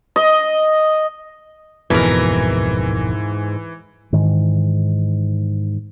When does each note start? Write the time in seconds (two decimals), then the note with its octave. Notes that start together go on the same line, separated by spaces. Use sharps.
0.16 D#5
1.90 D1 F2 G#2 B2 E3 A#4 B4
4.13 G#2 D#3 E3